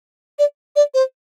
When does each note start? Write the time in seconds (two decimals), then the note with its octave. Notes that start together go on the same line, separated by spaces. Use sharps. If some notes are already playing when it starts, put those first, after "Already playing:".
0.39 D5
0.76 D5
0.94 C5